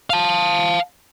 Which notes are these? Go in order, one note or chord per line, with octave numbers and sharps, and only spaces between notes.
F5 A5